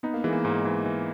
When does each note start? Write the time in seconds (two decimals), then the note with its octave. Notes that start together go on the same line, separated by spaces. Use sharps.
0.03 B3 D#4
0.14 A#3
0.24 E3 G#3
0.32 A#3
0.45 G#2
0.65 E3
0.86 E3